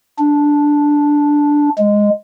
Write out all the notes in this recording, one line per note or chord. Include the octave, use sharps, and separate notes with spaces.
D4
G#3